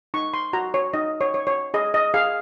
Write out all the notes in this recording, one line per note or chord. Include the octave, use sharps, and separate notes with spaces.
D#4 C#6
C6
F#4 A#5
C#5
D#4 D#5
C#5
C#5
C#5
G#4 D#5
D#5
G#4 F5